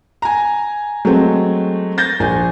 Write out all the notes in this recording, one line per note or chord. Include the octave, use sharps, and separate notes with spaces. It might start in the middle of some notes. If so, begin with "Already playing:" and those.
G#5 A#5
F#3 G#3 A3 C4
G6 A6 A#6
A#1 G#5